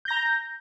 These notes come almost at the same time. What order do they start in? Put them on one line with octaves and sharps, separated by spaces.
G6 A#6 A#5